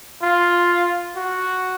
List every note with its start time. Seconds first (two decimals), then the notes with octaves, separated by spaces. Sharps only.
0.22 F4
1.17 F#4